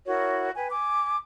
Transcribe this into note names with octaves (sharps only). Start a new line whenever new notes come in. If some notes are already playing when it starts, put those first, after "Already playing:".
E4 F#4 A#4 C#5
B4 G5 G#5
G#5 D6